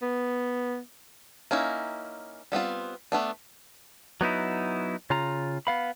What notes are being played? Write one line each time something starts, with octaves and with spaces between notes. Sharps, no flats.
B3
A#3 C#4 D#4 E4
G3 B3 C4 F4
A3 B3 D4
F#3 B3 D#4 E4
C#3 F4 A#5
B3 F5 B5